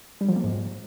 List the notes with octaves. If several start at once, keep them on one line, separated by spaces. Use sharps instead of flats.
G3
F3
A#3
G#2